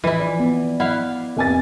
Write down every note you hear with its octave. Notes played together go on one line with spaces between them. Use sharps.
E3 F3 E4
D5
B3
E4 F5 F#5
F1 G#5 A6